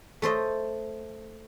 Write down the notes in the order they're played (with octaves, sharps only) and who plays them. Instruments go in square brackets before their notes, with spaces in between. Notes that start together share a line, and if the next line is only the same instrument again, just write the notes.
[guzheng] A3 A4 C5 D#5